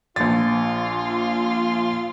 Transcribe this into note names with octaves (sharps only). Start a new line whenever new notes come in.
A#1 F4 A6